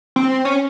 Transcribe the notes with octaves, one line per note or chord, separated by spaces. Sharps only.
C4
C#4